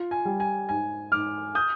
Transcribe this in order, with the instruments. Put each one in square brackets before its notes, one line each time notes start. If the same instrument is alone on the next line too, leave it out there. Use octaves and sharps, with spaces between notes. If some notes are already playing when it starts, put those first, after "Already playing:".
Already playing: [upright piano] F4
[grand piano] G#5
[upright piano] G3
[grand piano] G#5
[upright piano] G#2 [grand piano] G#5
[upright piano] G#2 [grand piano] D6 F6
[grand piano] D#6 G6